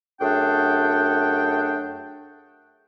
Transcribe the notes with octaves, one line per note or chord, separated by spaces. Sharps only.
F#2 A3 D4 G#4 F#5 G5